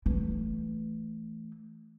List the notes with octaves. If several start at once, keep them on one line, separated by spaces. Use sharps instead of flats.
E3 A3